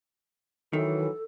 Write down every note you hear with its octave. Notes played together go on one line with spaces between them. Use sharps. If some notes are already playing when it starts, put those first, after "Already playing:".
D#3 E3 F#3 A4